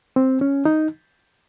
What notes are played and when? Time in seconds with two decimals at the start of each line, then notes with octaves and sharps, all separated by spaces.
0.16 C4
0.41 C#4
0.65 D#4